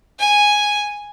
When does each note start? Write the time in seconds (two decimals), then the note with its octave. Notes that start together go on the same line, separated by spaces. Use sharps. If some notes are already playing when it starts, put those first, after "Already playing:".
0.19 G#5